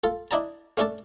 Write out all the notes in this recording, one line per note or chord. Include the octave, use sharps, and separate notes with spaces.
F4 A4
D4 E4 D#5 A5 A#5
A3 C#4 D4 A4 A5